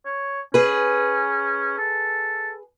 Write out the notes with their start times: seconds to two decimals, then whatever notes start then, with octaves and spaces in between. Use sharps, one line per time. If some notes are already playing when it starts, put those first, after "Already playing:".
0.06 C#5
0.54 C#4 G#4 B4
1.78 A4